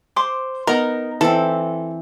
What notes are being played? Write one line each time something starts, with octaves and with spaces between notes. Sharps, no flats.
C5 C6 D6
B3 D#4 A#4 A#5
E3 C4 A4